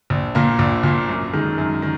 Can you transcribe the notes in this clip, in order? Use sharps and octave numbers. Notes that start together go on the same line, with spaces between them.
A#1
A#2 A#3
A#1
A#2 A#3
F#2
D#3 G#3
F#2
D#3